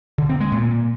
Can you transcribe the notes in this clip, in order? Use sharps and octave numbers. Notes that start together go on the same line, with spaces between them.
D3
C4
G#3
A#2